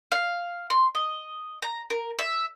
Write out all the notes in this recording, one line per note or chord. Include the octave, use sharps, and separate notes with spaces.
F5
C6
D#5
A#5
A#4
E5